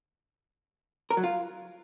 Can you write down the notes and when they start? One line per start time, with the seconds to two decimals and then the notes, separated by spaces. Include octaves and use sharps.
1.11 A#4
1.17 F#3
1.24 F4